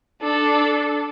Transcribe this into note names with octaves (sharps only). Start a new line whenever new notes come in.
D4 A4